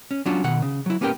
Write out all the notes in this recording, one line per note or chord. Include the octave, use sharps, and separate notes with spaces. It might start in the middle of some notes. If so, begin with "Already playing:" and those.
C#4
F#3 C#4 D4 F4 F#4
B2 D#3 F#5
C#3
F#3 E4
A#3 B3 C#4 G4 A#4 G5